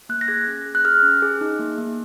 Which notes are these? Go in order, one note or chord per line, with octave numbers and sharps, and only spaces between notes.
A#3 F#6
A#6
G#4 G#6
C#4
G#4
F#6
G#4 F6
C#4
G#4
D#4
A#3
A#3